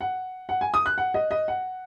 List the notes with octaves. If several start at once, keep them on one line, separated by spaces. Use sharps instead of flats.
F#5
F#5
G#5
D#6
F#6
F#5
D#5
D#5
F#5